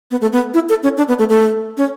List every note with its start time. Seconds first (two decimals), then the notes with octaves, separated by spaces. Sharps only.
0.11 B3
0.21 A3
0.33 B3
0.54 E4
0.69 A4
0.83 C#4
0.97 D4
1.08 B3
1.19 A3
1.29 A3
1.77 C#4